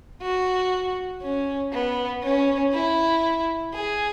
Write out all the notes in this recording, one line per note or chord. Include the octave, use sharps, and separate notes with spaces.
F#4
C#4
B3
C#4
E4
G#4